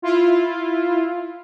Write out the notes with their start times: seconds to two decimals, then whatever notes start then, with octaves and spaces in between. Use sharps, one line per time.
0.02 E4 F4